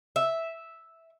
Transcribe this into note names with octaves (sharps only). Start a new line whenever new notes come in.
E5